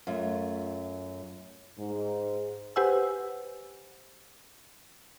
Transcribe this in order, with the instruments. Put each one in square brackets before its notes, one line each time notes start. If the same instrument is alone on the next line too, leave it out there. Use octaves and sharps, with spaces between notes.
[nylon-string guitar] F#2 A3 F4
[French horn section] G#2
[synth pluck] G4 B4 C5 F#5 G#5 E6